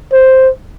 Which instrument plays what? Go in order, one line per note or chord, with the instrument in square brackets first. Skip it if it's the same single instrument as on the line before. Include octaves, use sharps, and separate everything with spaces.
[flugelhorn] C5